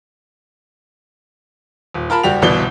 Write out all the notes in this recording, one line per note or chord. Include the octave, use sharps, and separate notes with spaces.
D#1
F4 A#4 A5 B5
F#1 G3 F#4 G4 F7
G1 C2 B2 E3 D5 G7